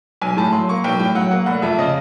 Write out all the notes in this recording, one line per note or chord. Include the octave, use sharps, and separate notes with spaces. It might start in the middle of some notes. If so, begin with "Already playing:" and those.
B1 G#5
A2 A5
F#3 C6
A#3 C#6
B1 G5
A2 G5
F#3 F#5
A#3 F#5
F1 F#5
F2 E5
C#3 D#5